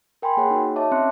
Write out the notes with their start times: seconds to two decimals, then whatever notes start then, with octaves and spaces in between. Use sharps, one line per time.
0.22 A#4 G5 G#5 B5 C6
0.37 A#3 G#4 C#5 F#5
0.51 D#4 F#4
0.76 C#5 D#5 E5 A5 D6
0.91 C4 C#4 E5 C6 F#6 C#7